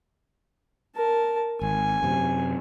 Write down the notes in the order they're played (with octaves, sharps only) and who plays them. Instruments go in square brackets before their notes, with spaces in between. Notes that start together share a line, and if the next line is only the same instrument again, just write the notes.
[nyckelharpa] A#4 A5
[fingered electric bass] G#1 [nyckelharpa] G#5
[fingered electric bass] F#2 C3